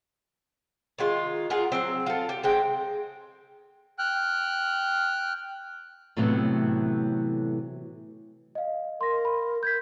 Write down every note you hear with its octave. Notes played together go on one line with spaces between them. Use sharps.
D#3 G#3 F4
F4 G#4 A#4 F#5
F#3 C4
F4 A4
G4
G#3 C4 G5
G5 F6 F#6
A2 C3 E3 F#3 A3 B3
D#5 F5
A#4 C6 A#6
B5
A#4 G6 G#6 B6